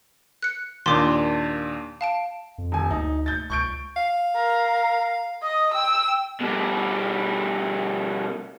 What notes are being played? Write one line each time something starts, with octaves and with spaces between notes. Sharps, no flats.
F#6 C#7
D#2 A#2 D4 C6 D6
F5 A5 D7
F2
D#1 G#5
D2 D#4
G6 A6
C#2 C#6 G6 D7
F5
A#4
D#5 D#6
G5 E6
B2 G3